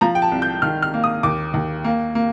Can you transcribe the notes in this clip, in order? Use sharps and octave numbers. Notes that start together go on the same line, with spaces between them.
F3 A#5
G5
A5
C2
G6
D#3 F6
F6
A#3
D#6
D#2 D6
D#2
A#3
A#3